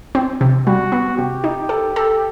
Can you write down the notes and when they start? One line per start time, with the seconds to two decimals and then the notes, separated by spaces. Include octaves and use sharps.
0.15 C4
0.41 C3
0.66 G3 F#4
0.92 B3
1.17 C3 G4
1.44 D#4
1.69 A4
1.96 A4